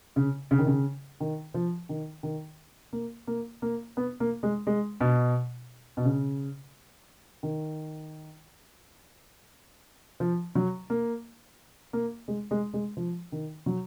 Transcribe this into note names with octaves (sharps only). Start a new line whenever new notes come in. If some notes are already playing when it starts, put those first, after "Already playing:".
C#3
C#3
D#3
C#3
D#3
F3
D#3
D#3
A#3
A#3
A#3
B3
A#3
G#3
G#3
B2
B2
C#3
D#3
F3
F#3
A#3
A#3
G#3
G#3
G#3
F3
D#3
F#3